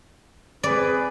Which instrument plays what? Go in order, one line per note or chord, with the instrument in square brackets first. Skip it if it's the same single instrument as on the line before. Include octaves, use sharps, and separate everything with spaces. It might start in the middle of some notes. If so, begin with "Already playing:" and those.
[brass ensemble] C4 G#4 B4 [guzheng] D5